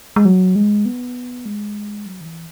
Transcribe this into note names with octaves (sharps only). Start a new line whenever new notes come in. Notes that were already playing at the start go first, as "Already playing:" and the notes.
G#3
F#3
G#3
B3
G#3
F#3
D#3
E3